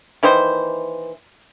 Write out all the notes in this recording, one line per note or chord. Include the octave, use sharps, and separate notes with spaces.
D#3 E3 A#3 C5